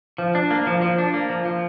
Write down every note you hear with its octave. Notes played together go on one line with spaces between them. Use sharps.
F3
D4
A#3
F3
F3
D4
A#3
F3
F3